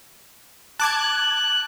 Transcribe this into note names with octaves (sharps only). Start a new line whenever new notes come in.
A5 D6 F#6 G#6